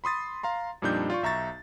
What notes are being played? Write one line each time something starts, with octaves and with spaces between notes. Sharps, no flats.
B5 C6 D#6 A6
F5 A#5 C6
F2 A#2 G3 D4 D#4 G6
F4 D5 C#6
B1 E5 A#5 C#6 A6